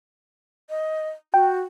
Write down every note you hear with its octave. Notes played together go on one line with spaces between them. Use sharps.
D#5
F#4 G5